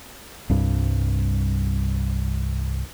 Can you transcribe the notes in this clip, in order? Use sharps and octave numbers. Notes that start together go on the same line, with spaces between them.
C2 G2